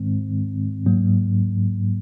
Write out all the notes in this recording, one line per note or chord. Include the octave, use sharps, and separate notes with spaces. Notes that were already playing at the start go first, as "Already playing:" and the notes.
Already playing: G#2 D#3 G#3 C4
G#2 F#3 A#3